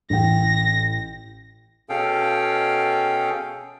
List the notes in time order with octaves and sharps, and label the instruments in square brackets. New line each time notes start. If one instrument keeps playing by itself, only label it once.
[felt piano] A1 G5 [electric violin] A#6
[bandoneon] B2 C#4 G#4 A4 F5 G5